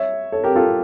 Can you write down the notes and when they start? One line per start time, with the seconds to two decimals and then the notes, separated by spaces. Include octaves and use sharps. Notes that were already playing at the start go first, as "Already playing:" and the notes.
Already playing: C#5 E5
0.32 A4 C#5
0.44 G4 A#4
0.56 F4 A4